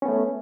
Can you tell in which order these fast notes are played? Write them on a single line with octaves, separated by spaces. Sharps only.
C#4 B3 A3